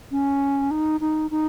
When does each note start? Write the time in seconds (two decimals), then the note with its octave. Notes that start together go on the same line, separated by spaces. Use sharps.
0.11 C#4
0.71 D#4
1.01 D#4
1.31 D#4